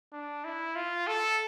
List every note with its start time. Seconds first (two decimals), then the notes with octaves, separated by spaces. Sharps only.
0.13 D4
0.45 E4
0.75 F4
1.07 A4